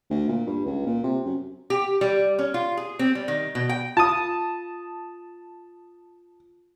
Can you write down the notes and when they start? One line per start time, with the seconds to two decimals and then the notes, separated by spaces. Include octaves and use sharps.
0.10 D2
0.29 A#2
0.46 G2
0.66 C#2
0.86 A#2
1.04 C3
1.26 F#2
1.70 G4
2.01 G3
2.39 C#4
2.54 F4
2.77 G#4
2.99 C4
3.15 G3
3.28 D#3
3.55 B2
3.69 G5
3.97 F4 A5 D#6 D#7